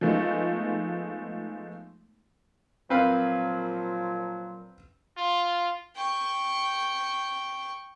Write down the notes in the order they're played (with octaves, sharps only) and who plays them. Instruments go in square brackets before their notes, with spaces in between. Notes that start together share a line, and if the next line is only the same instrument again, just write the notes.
[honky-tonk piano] F3 G#3 A3 B3 D#4
[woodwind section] A#2 F3 F#3 [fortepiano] C4 B4 F5
[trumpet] F4
[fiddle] G5 C#6